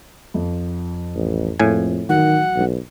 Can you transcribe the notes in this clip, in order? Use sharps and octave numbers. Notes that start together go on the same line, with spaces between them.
F2 F3
A1
F2 A2 A#3 G#4 F5 G#5
D#3 E3 F#3 F#5
B1